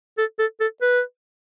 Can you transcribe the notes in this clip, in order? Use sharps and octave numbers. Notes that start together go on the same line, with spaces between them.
A4
A4
A4
B4